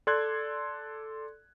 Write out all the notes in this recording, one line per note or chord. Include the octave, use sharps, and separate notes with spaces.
A4 D5 C6 F#6 G#6